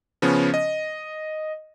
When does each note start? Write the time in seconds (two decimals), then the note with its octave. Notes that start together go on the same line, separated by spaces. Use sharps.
0.22 C#3 F3 B3 C#4
0.54 D#5